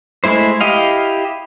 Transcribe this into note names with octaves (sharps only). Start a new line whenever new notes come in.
G#3 A3 E4 C5
E4 G4 D#5 F5